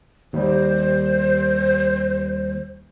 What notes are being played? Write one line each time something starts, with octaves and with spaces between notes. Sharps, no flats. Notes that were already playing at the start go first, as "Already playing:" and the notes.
D#2 G3 C5